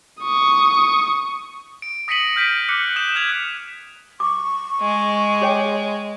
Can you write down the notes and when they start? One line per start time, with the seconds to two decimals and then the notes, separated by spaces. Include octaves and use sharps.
0.21 C#6 D#6
1.82 D7
2.08 D#6 A#6 B6 C#7 D#7 F#7
2.36 F6 G6 B6 D7 D#7
2.69 D6 F6 F#6 C#7
2.96 D#6 G6 E7
3.15 F6 F#6 G#6 F7
4.20 C#6 D6
4.81 G#3
5.41 G#4 C#5 G5